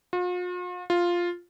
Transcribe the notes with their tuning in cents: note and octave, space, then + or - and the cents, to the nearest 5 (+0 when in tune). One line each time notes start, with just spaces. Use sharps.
F4 +45
F4 +0